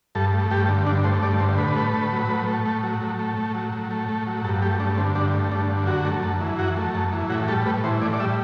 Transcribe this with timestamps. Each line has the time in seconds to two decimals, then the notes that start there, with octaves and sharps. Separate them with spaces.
0.15 G2 A4
0.33 A3
0.51 G2 G4
0.68 D3
0.86 G2 D4
1.04 A3 C5
1.22 G2 D5
1.40 D3 C5
1.58 A2 B4
1.76 A3
1.94 A2
2.12 F#3
2.29 A2
2.48 A3
2.65 A2
2.83 F#3
3.01 A2
3.19 A3
3.37 A2
3.55 F#3
3.73 A2
3.91 A3
4.09 A2
4.27 F#3
4.44 G2 A4
4.62 A3 G4
4.80 G2 D4
4.98 D3 C4
5.15 G2 D4
5.34 A3
5.52 G2 D4
5.70 D3
5.87 F#2 F#4
6.05 A3
6.23 F#2
6.41 E3
6.59 F#2 F#4
6.77 A3
6.95 F#2
7.12 E3
7.30 A2 F#4
7.48 G3 A4
7.66 A2 B4
7.84 E3 C5
8.02 A2 D5
8.13 D5
8.20 G3 E5